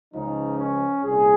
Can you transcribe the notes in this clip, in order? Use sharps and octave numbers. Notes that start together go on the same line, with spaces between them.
C#2 C#3 F3 D#4
C#4
C2 A#2 G#4